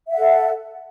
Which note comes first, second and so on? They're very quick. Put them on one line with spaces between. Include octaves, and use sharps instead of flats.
E5 F#5 A4